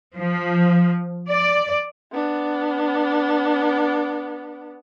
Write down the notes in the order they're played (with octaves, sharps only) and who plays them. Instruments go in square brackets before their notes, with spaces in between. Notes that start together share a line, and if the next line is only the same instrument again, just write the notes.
[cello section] F3
D5
[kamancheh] B3 D4